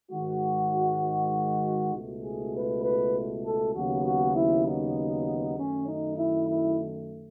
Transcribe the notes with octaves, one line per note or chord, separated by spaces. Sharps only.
G#2 D#3 G#3 F#4
C#2 B2 A3
G#4
B4
B4
A4
D#2 C#3 F#3 B3 F#4
F#4
E4
D#4
F#2 D#3 A3 C#4
D#4
E4
E4